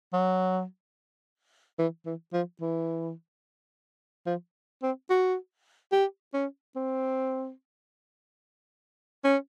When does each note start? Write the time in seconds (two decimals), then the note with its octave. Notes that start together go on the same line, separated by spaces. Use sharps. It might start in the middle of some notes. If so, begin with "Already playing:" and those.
0.13 F#3
1.79 E3
2.06 E3
2.33 F3
2.61 E3
4.26 F3
4.83 C4
5.10 F#4
5.92 G4
6.34 C#4
6.76 C4
9.24 C#4